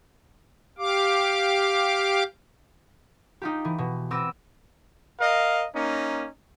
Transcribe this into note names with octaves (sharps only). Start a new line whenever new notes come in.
G4 F5 D6
D#4 F4 G4
E3
B2
B3 C4 D6 E6 A#6 E7
A#4 D#5 F5
A#3 C#4 D#4